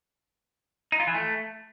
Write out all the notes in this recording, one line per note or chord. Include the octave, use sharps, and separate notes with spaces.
D#4
F4
E3
A3